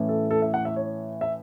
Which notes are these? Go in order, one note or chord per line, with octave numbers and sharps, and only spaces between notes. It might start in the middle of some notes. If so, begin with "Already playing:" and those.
Already playing: A2 E3 A3 C#4
A4
A4
E5
F#5
E5
C#5
E5